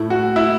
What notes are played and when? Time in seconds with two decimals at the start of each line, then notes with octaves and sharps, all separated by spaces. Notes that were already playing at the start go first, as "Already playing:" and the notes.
Already playing: A2 A3 E4
0.10 F#4
0.36 E4